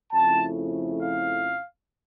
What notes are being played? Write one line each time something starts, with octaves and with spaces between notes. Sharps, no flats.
F2 C#3 F3 A3 E4 A5
F5